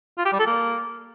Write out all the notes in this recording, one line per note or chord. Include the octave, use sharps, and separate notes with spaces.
F4
G4
G3
A4
A#3